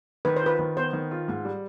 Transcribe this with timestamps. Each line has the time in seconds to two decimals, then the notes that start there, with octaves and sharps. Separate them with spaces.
0.25 D#3 B4
0.36 C5
0.42 F4 B4
0.59 D#3
0.76 B3 C5
0.93 D#3
1.11 F4
1.28 G#2
1.45 G3